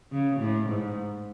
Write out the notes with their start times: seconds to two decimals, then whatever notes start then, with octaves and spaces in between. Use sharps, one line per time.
0.12 C#3
0.40 A2
0.69 G#2